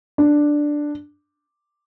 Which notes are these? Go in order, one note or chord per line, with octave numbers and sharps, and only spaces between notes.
D4